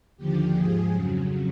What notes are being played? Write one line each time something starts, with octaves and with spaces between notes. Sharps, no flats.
D#2 D3 F3 G4
G#2 F3 G#4
F2 C#3 F#3